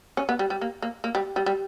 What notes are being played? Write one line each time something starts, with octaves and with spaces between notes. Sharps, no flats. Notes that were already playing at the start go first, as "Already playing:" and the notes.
C#4
B3
G3
G3
A#3
A#3
A#3
G3
G3
G3